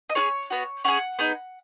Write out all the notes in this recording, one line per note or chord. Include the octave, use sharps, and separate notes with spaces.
D#5
C#4 F4 G#4 C#5
B3 F#4
C#4 G#4 F#5
B3 D#4 G#4